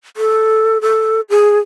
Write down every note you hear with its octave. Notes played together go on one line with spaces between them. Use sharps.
A4
A4
G#4